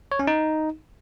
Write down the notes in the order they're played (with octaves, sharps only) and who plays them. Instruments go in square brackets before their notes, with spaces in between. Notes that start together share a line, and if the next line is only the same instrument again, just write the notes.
[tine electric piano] C#5
C#4
D#4